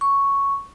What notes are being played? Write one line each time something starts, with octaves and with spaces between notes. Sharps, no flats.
C#6